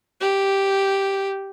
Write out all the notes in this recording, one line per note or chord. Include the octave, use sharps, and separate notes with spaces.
G4